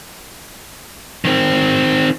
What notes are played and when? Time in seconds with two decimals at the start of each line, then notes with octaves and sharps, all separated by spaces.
1.25 D#3 C4